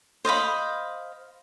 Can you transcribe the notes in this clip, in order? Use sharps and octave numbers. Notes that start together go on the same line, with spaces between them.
C5 D#5 F5 B5